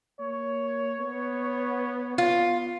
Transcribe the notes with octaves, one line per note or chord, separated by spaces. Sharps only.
A#3 C#5
B3
B3 F4